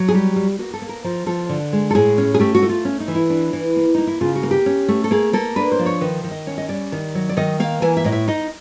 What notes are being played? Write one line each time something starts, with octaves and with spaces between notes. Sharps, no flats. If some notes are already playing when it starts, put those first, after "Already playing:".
Already playing: F#3
G#4
G3 G4
G3
A#3 F#4
A4
A#3
A#4
F3 A#4
F3 A4
D3
G#3
A4
A2 G#4
C#4
G#4
A3 G4
F#4
A3
F4
C#4
D#4
E3
E4
D4
E3
A#3
A#3 D#4
E4
C#3 F4
F#4
A#3
G4
C#4
A3
A4
A#3 G#4
A#3 A4
D4 B4
C5
F3
C#5
D#3 B4
D#3
D#5
C#4 C#5
D#5
G3 D5
D#3
F#3
D5
D#3 D#5
A#3 F5
E3 G#5
E5
A2 D#5
E5
D#4 D#5